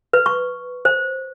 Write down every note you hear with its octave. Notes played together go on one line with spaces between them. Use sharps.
B4
C#6
C5